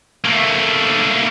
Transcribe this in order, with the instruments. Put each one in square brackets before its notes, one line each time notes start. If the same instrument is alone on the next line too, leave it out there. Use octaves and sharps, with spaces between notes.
[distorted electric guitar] A3 A#3